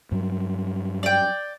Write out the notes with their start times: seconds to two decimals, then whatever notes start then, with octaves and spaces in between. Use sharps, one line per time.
0.12 G2 F#3
1.03 D5 G5